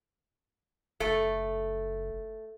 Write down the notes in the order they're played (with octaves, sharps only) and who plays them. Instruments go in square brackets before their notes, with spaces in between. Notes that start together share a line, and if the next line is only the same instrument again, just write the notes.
[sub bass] F#1 [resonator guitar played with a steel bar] A3